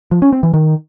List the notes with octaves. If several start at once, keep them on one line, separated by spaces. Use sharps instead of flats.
F3
C#4
C4
E3
D#3